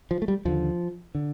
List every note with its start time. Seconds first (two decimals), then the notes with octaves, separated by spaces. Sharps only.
0.11 F3
0.22 A3
0.28 G3
0.45 D#2 D3 F3
1.15 D3